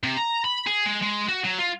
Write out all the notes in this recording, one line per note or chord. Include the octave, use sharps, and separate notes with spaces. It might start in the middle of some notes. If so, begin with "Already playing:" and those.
C3
A#5
B5
G#4
G#3
G#3
F#4
F#3
F4